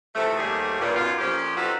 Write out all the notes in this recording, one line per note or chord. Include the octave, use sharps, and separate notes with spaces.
C3 E3 F3 A3
D#2 G#2 G3 A3 G4 G#4
G2 A#2
F#2 D#3 B3 F4
F2 A#2 F3 C#4 G4
C4 D#4 F4 F#4 A4 B4